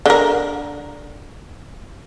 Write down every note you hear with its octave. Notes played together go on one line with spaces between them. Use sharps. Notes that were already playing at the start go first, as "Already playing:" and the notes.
D3 A#4